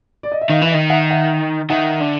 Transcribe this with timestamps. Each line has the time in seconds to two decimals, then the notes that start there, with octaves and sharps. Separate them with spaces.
0.23 D5
0.32 D#5
0.41 E5
0.49 D#3 D#5 F5
0.62 E3 E5
0.71 D#5
0.74 D#3
0.90 E5 F#5
1.11 E5 F#5
1.70 D#3 E5 F#5
2.00 D3